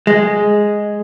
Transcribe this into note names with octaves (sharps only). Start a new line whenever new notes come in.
G#3